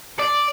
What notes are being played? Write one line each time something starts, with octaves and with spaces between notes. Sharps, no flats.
D5